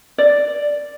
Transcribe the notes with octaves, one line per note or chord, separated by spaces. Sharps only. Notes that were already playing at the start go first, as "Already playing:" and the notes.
D5